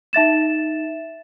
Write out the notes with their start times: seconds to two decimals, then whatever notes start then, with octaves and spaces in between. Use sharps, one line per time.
0.13 D#4 E5 A6 E7